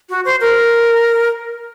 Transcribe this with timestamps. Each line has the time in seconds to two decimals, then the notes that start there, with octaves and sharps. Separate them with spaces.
0.10 F#4
0.25 C5
0.41 A#4